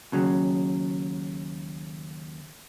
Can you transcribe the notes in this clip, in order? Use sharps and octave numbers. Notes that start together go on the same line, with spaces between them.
D#2 C#3 F#3